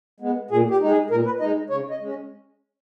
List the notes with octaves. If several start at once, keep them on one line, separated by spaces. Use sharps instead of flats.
G#3 B3
A#2 G#4
G4
G#3 D#4
G#4
A#2 A#4
B4
G#3 D#4 D#5
C#3 C#5
D#5
G#3 C#4